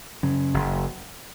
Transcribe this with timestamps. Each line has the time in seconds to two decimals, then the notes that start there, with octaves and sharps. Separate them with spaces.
0.23 F#2 C#3
0.54 F#1